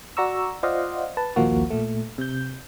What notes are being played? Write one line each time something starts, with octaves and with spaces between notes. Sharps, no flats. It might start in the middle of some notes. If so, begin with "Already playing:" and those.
F#4 D5 A#5 C#6 E6
F4 C5 D5 D#5 F5 F#5
B4 A5
A#1 D#2 A#2 F3 A#3 F#4
A#2 A3
C3 G6